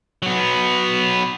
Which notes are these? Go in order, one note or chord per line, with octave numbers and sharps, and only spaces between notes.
F#3 B3